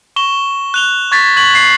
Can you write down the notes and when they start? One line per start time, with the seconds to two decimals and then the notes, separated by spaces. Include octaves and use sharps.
0.16 C#6 E7 G7
0.74 F#6 F7 G7
1.12 C#6 G#6 A6 B6
1.36 C#6 G#6 B6 F#7
1.55 C7